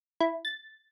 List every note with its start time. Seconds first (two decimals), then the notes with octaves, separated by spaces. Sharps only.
0.20 E4
0.45 A6